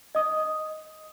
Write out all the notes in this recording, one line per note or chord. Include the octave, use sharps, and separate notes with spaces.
D#5 D#6